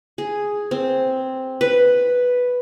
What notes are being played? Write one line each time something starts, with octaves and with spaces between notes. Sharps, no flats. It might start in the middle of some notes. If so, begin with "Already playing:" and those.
G#4
C4
B4